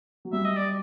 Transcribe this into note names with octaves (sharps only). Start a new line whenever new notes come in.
F#3
G3 E5
D#5
D5